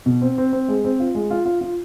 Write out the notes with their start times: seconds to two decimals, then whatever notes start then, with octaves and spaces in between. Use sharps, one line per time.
0.06 B2
0.21 C4
0.38 C4
0.53 C4
0.68 G#3
0.84 C4
1.00 F4
1.15 G#3
1.31 F4
1.45 F4
1.61 F4